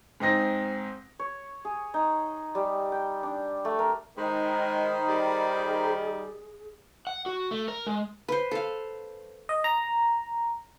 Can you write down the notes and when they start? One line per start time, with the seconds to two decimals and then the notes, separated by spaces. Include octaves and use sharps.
0.20 G#2 C4 D#4 A#6
1.19 C#5
1.65 G#4
1.94 D#4
2.55 G3
2.92 G5
3.23 D4
3.65 A3
3.79 A#4
4.17 D#3 G#3 D#4 C5 B5
5.08 G3 G#4
7.07 F#5
7.26 F#4
7.51 A3
7.68 A#4
7.87 G#3
8.28 B4 C5
8.51 A4 F5
9.49 D#5
9.64 A#5